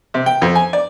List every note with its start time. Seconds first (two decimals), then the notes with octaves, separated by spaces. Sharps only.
0.14 C3
0.26 G5
0.42 F2
0.55 G#5
0.73 D5